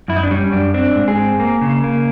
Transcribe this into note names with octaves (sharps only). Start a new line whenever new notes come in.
F#2 E4
D#4
D4
G3 C#4
F#2 D4
C4 D4
G#2
G#4
C4
A#3
C#3
A#3